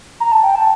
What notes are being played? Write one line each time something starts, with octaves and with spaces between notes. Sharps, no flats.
A#5
A5
G5
A5